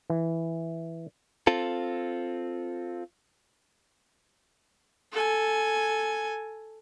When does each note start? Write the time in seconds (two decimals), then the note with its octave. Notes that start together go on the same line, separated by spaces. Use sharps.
0.10 E3
1.47 C4 F4 A4
5.12 A4 G#5